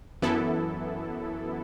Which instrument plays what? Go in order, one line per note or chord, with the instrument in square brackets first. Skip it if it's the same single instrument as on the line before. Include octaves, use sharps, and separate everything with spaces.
[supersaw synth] F#2 E3 B3 E4 A4